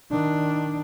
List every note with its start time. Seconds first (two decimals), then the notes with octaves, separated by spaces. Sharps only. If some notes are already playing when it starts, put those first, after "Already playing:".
0.11 D#3 D4